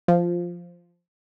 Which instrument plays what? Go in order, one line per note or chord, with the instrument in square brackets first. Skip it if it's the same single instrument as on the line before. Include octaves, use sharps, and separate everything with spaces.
[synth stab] F3